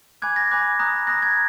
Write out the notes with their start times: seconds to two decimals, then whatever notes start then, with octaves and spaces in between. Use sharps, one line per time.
0.22 G#5 B5 D6 F#6 G#6
0.36 A#6
0.51 G#5 B5 D6 F#6
0.79 A#5 D#6 F#6
1.07 A#5 D#6 F#6 A#6
1.22 G#6